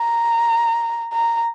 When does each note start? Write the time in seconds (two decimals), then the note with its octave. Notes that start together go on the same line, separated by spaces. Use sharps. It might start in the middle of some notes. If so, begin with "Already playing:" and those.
Already playing: A#5
1.12 A#5